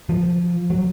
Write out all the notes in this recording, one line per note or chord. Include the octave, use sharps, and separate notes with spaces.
F3
F#3